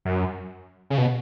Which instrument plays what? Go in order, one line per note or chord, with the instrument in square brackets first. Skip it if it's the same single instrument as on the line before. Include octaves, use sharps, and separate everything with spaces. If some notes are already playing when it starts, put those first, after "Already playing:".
[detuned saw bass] F#2
C#3
B2